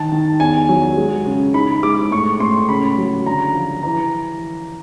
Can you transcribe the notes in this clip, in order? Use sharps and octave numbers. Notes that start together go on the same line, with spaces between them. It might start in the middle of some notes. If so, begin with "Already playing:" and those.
Already playing: D#3 A5
D#3
E2 G#5
F#3
G#3
C#3
D#4 B5
G#3 D6
A2 C#6
A2 C6
C#3 B5
F#3
D3 A#5
F3
E3 A#5